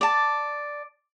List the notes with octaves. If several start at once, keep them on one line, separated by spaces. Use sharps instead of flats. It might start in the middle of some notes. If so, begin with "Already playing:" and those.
D5 A5